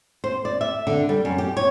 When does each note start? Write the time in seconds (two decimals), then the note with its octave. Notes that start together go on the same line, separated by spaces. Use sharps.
0.24 C5
0.45 D5
0.61 E5
0.87 D3
1.09 G3
1.25 F#2
1.38 G4
1.57 C#5